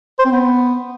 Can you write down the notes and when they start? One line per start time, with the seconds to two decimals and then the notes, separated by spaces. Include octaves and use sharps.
0.19 C5
0.25 C4
0.32 B3